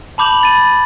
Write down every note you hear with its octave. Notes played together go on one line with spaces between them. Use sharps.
A5 B5 D6 G6 F7 F#7
B5 A6 D#7